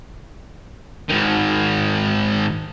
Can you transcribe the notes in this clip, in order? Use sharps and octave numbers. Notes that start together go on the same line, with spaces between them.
G#2 D#3